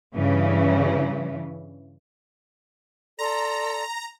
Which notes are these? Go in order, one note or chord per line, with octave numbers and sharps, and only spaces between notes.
G2 C#3 E3
A4 D5 A#5 C6